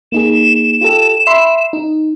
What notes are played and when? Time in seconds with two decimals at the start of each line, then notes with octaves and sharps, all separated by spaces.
0.12 A#3 D#4 G#4 E7
0.81 F4 G4 A4
1.27 E5 B5 C6
1.73 D#4